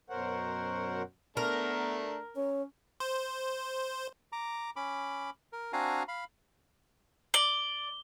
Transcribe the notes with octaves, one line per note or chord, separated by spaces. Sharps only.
F#2 B2 A#4 C5 C#5 F#5
A3 B3 D4 A#4
C#4 C#5
C5
A#5 D6
C#4 B5 D6
A#4
C4 D4 F#4 F5 G#5 A#5
F5 B5
D5 G7